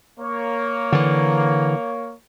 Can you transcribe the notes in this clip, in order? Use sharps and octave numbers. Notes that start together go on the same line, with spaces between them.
A#3 C#5
D3 E3